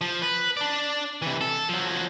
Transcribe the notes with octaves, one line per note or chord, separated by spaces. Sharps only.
F3
B4
D4 D5
C3 E3
A4
F3 F#3